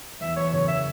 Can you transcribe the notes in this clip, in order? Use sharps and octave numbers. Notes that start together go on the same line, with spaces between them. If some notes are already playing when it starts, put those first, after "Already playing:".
E2 E5
E2 C#5
F#1 C#5
E5